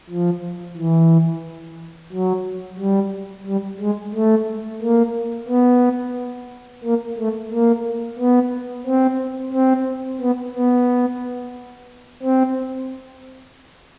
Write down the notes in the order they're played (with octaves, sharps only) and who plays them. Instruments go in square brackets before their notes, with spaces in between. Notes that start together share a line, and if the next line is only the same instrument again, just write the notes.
[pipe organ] F3
E3
F#3
G3
G3
G#3
A3
A#3
B3
A#3
A3
A#3
B3
C4
C4
B3
B3
C4